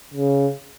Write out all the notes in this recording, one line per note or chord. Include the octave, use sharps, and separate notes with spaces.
C#3